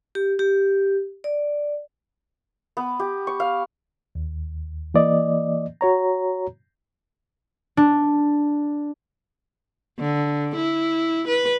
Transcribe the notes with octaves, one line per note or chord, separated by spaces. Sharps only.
G4
G4
D5
B3
G4
C#6
F5
D#2
E3 A#3 D5 D#5
F#4 C#5 A#5
D4
D3
E4
B4